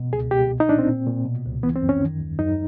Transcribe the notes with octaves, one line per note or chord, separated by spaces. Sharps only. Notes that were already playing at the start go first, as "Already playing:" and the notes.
Already playing: B2
C#2 G#4
B2 G4
C2
D#4
A#2 D4
C4
A#2
A#2
B2
C#2
E3 B3
C4
F#2
C#4
D#3
D#2
F#2 D#4